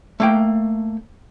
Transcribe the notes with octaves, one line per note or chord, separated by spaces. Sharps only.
A3 A#3 G5